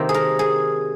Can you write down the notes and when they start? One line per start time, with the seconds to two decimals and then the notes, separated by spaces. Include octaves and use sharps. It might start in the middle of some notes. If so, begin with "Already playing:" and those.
Already playing: C3 D#3 A#3 C5
0.09 G#4
0.14 A#4
0.39 G#4